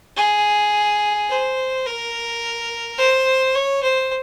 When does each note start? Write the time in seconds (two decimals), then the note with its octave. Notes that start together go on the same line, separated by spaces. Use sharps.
0.17 G#4
1.29 C5
1.86 A#4
2.98 C5
3.55 C#5
3.83 C5